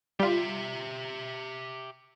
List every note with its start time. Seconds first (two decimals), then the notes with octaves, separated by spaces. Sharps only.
0.20 G3 F4 G4 E5